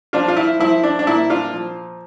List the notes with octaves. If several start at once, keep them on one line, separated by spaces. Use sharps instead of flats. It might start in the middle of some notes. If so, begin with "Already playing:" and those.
F3 D4 F4
F4
E4
F3 E4
D4
D4
A#2 E4
D4 F4
F3